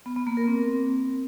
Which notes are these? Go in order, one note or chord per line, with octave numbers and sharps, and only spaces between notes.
B3
B3
A#3
A#4
C4